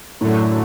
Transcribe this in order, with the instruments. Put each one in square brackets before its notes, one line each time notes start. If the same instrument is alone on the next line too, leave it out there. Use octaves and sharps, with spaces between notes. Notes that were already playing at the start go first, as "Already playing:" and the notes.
[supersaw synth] F#2 D3 F#3 A3 [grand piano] A2